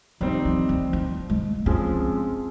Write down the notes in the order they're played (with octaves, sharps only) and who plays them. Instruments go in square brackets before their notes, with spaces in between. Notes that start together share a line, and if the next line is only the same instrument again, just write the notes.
[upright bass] F3 [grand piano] G3 C4 D#4
[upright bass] F3
F3
F3
G#3
[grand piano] F2 C#3 F3 G#3 [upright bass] C4